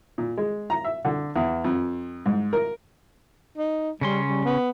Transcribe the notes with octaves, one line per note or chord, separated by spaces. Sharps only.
A#2
G#3
A#5
E5
D3
E2
F2
G#2
A#4
D#4
C#3 G3 C#4 C6
G3
B3